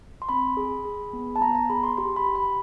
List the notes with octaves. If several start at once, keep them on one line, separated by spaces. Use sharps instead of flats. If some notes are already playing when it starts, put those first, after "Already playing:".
C6
C4 B5
G#4
G#4
B3
A5
B3 A#5
A#5
G#4 B5
C6
G4 C6
B5
G4
B5